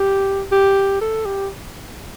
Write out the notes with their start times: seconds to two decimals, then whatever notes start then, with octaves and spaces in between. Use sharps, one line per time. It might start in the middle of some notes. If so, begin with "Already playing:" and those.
Already playing: G4
0.52 G4
1.01 A4
1.26 G4